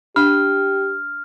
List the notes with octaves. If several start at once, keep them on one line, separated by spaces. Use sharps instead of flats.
D4 G4 F6